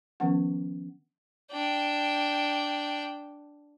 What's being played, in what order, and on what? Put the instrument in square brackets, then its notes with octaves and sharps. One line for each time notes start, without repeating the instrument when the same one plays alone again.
[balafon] D#3 F3 B3 C#4 F#5
[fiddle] D4 G5